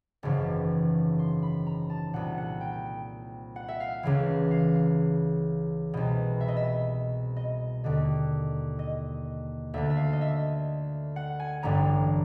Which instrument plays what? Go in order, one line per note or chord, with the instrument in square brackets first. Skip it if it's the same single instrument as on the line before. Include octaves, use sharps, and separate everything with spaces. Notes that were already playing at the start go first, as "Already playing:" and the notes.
[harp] G#1 F#2 C#3 E3 C#6
C6
B5
A#5
A5
C2 A#2 F#5
F#5
G5
F#5
E5
F5
C#2 C#3 E3
F5
C2 B2
E5
D#5
E5
D#5
D#2 D3
D#5
D2 D3 E5
E5
F5
D#5
E5
F#5
G#5
A1 G2 D3 A#5